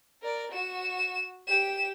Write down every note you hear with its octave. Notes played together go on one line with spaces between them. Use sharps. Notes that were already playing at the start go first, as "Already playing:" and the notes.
A#4 D5
F#4 E7
G4 E7